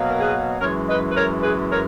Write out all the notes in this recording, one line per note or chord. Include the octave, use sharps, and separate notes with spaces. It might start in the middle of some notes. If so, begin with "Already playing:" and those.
Already playing: B2 F#3 A#3
A#4
G#4 B4
F#2 E3 G#3 A#4 C#5
B4 D#5
B4
A#4 C#5
G#4 B4
A#4 C#5